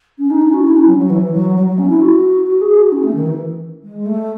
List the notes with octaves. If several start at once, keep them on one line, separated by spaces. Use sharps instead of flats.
C#4
D#4
C#4
F#4
E4
C#4
F#3
F#3
E3
F#3
F#3
F#3
C#4
E4
F#4
F#4
G#4
F#4
C#4
A3
D#3
E3
G#3
A3